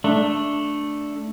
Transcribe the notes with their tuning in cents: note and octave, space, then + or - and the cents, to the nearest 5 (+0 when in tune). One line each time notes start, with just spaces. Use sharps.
A3 +0 D4 +0